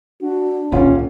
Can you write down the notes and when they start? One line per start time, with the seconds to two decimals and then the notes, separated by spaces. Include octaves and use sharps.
0.21 D4 F#4
0.72 D#1 C2 A#2 C#4 F4